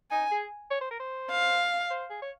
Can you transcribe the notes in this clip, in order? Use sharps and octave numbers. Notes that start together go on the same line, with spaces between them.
D#4 G#5
G#4
C#5
C5
A#4
C5
F5
C5
G#4
C#5